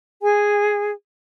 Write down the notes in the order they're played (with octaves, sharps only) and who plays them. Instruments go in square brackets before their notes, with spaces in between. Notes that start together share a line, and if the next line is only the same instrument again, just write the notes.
[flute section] G#4 G#5